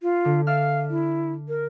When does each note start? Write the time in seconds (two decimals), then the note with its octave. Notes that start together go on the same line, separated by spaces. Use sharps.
0.03 F4
0.25 D3
0.47 D5 E5 F5 F6
0.90 E4
1.48 A#4